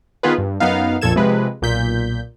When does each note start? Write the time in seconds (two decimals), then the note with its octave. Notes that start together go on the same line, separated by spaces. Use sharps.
0.23 D#3 B3 F4 G#4 B4
0.38 G2
0.60 F#2 B3 D#4 F5
1.01 A#1 F2 A#2 A4 G#6 E7
1.16 C3 F3 G#3 B4
1.62 B1 A#2 G6 B6